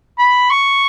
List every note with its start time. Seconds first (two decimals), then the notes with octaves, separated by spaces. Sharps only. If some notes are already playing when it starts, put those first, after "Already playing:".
0.19 B5
0.50 C#6